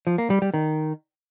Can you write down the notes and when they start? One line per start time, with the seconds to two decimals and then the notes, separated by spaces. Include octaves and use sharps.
0.07 F3
0.18 A#3
0.30 G3
0.42 G3
0.54 D#3